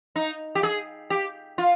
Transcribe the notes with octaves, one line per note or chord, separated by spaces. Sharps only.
D#4
G4
G#4
G4
F4